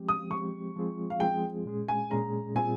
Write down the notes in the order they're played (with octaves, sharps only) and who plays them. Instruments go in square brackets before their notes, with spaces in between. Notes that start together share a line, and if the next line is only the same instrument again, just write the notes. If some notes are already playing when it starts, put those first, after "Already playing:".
Already playing: [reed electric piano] F3 G#3 C4 G4
[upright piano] D#6
[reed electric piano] F3 G#3 C4 G4 [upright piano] C#6
[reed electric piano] F3 G#3 C4 F4 G#4
[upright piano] F5
[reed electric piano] F3 G#3 C4 F4 G#4 [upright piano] G5
[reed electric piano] A#2 G#3 C#4 G#4
[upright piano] G#5
[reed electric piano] A#2 G#3 C#4 G#4 [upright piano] A#5
[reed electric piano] A#2 G3 C4 F4 G#4 [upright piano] G#5